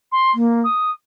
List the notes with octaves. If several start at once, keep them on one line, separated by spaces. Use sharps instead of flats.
C6
A#3
D#6